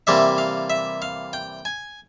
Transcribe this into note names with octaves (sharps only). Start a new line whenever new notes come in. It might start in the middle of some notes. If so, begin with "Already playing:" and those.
C3 E3 G3 A#3 E5
F5
E5
F5
G5
G#5